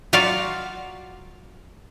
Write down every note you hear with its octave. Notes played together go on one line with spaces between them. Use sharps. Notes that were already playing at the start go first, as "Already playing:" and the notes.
F#3 F4 F#4 D5 F5